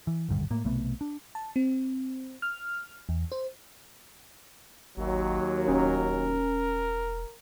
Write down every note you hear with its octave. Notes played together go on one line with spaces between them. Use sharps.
E3
D#1 G#1 G2 D3
A2 A#3
B1 C3 A3 B3
D4
A5
C4
F6
E2
C5
G#1 D#2 F#3
E1 C#4 A#4